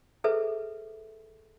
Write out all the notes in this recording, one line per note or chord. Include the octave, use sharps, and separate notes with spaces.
G#4 A4 B4 C5 E5